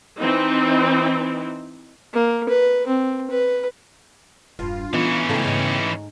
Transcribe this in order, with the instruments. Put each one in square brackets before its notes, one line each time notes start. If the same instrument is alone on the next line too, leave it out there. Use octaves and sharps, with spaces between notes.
[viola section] E3 C4 D#4
[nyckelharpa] A#3
B4
C4
B4
[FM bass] E1 [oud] G2 [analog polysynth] F4
[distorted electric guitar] E3 C#4 [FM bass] B3 [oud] D#4
[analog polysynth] C#3 G5 [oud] F3 A3 D#4
[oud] G#2 D#4